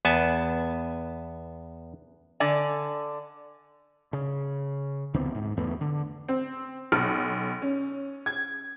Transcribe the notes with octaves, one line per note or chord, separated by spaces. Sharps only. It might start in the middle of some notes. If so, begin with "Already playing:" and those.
E2 B3 G#5 A5
D3 D5 G#5
C#3
C#2 D#3 B3 C4
G#2
D1 E2 A3 B3
D3
C4
B1
C#4
G#6